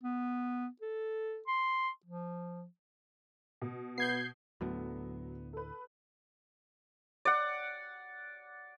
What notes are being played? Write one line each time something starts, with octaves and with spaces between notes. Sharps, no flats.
B3
A4
C6
F3
B2
B3 G6 G#6 C7
D2 A2 D3 F#3 B3
A4 B4
D5 F#5